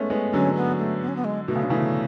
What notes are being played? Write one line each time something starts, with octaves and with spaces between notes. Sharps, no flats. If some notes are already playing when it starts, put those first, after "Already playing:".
Already playing: G#3 A3 B3 C#4
G#3 B3
D3 F#3 C#4
B3
A3
B3
C#4
B3
G#3
B2 A3
C#3
D3
C#3 E3 A3